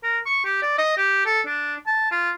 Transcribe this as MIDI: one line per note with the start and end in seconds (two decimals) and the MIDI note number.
0.03 0.19 70
0.26 0.41 85
0.45 0.60 67
0.62 0.78 74
0.78 0.93 75
0.98 1.24 67
1.26 1.41 69
1.47 1.75 62
1.87 2.10 81
2.11 2.31 65